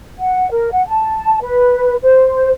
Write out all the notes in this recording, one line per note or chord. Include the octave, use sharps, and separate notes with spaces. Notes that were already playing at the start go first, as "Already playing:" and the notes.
F#5
A#4
F#5
A5
B4
C5